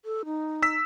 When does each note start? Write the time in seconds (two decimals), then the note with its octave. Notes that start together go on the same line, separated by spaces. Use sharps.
0.05 A4
0.25 D#4
0.62 E6 B6